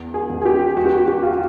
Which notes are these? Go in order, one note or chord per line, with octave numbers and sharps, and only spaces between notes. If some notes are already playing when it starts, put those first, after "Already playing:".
Already playing: E2
G#4
E2
G#4
G4
E2 F#4
G4
F#4
G4
F4
F#4